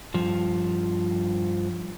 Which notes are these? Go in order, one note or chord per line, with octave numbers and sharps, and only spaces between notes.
G2 F3